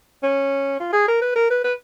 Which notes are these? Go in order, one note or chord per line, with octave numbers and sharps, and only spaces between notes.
C#4
F4
G#4
A#4
B4
A#4
B4
B4